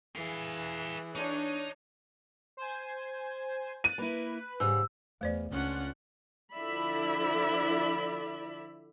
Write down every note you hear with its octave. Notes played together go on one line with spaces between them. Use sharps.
E3 G#4 B4 F5
D4 D#4 C#5
C5 G#5
F#6 A6 D#7
A#3 E4 B4
G#2 C#3 G3 E6
E2 A3 C5 D5
C#2 C#4 D4 F4 F#5
D3 F3 E4 D5 E5 B5